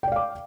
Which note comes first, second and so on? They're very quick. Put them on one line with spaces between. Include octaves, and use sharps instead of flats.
G5 D5 F5 D6